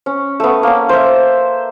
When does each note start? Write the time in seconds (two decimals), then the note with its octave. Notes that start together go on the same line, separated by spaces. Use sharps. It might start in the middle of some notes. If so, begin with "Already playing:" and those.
0.06 C#4
0.40 A3 B3
0.63 A#3 C#4
0.89 C5 E5